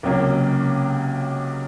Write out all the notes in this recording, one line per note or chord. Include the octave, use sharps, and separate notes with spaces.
C#2 C3 F#3 A#3 C#4